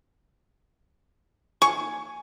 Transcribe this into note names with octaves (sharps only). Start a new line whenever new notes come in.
G#5 C#6